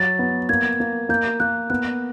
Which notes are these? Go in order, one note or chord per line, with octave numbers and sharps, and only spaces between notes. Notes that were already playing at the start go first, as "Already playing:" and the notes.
Already playing: F#3 A6
B3
A#3 G#6
A#3
A#3 G6
A#3 F#6
B3 F#6